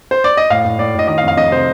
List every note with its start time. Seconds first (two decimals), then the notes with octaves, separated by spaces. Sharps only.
0.11 C5
0.24 D5
0.37 D#5
0.50 A2 F5
0.65 A2
0.79 A2 D5
0.94 A2 D#5
1.08 D#3 D#5
1.18 F5
1.23 F2
1.28 F5
1.37 F2 D#5
1.52 C3 C5